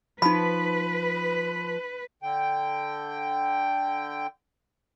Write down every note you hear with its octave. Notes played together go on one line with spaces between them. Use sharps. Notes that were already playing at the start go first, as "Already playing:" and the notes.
F3 D#4 B4 B5
D3 G5